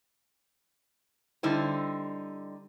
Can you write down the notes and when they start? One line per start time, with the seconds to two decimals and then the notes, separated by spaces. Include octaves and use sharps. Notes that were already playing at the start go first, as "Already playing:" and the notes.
1.43 D3 G3 D#4 E4 C5